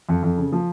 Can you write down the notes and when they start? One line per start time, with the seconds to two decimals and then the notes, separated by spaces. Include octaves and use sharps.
0.09 F2
0.23 F2
0.38 C#3
0.52 F3